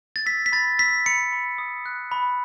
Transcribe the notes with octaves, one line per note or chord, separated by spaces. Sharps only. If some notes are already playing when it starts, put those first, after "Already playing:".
A6
E6 B6
B6
B5 A6
E6 B6
B5 C#7
B5
D#6
F#6
B5